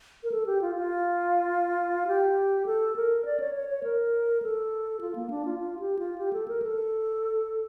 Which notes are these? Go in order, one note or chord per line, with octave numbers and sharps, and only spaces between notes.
A#4
A4
G4
F4
F4
G4
A4
A#4
D5
C#5
C#5
C#5
A#4
A4
F4
A#3
D4
F4
F4
G4
F4
G4
A4
A#4
A4